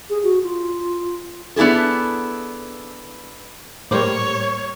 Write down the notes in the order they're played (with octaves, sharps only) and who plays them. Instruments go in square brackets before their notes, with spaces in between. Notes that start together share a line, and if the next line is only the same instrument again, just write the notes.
[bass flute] G#4
F#4
F4
[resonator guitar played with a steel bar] B3 D4 E4 G#4 A4
[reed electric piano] A2 G3 [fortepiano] A#3 C5 D6 [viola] C#5